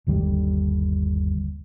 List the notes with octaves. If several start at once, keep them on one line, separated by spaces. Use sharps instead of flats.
G1 D#2 D3 G3